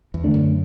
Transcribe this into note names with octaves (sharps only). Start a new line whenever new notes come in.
E2
D3 A3 D4
F#2